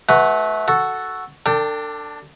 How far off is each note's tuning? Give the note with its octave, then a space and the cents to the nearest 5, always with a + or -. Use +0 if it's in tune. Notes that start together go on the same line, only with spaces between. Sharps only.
A3 -30 F#4 +0 B4 +0
F#4 +0 A4 +0
D4 +0 A4 +40 G5 +0